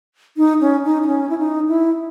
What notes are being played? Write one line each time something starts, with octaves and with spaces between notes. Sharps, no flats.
D#4
C#4
D#4
D#4
C#4
E4
D#4
E4